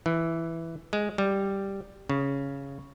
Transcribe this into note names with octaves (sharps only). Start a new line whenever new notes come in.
E3
G#3
G3
C#3